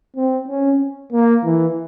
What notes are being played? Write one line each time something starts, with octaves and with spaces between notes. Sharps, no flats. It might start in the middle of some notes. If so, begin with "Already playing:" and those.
C4
C#4
A#3
E3